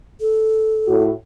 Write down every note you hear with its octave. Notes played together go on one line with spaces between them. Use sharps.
A4
A2 F#4